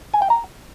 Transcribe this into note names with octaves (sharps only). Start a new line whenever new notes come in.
G#5
G5
A#5